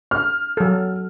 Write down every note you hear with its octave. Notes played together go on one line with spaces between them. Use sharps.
F6
F#3 A4